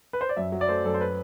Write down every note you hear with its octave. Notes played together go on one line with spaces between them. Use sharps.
B4
C5
D5
F#2 E5
F#3
D5
A3 C5
F#2 A4
C5
B4